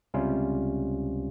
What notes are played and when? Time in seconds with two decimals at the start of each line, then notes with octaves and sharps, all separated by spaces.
0.14 C#2 C3 G3 C#4 F4